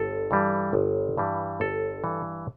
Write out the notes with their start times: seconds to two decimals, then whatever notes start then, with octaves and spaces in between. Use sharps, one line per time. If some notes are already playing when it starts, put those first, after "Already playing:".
Already playing: G1 A4
0.31 G2 E3 G3
0.73 G1
1.17 G2 E3 G3
1.60 G1 A4
2.04 G2 E3 G3